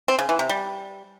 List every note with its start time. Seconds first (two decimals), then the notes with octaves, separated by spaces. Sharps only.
0.08 C4
0.19 C#3
0.29 E3
0.39 C3
0.49 G3